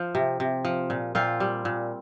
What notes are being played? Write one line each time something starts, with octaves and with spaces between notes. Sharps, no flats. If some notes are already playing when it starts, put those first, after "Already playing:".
Already playing: F3 C5
C3
C3
F3
A#2
A#2 C4 F4
G3
A#2